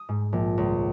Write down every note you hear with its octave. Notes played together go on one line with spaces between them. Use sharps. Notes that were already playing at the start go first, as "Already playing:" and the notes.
Already playing: D#6
G#2
A#1
C#2